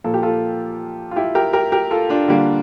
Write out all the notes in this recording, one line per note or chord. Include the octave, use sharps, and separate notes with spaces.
A#2 F3 A#3 A4
G4
F4 A4
F4
E4 G4
G4 A#4
G4 A#4
G4 A#4
F4 A4
D4 F4
D3 G3 A#3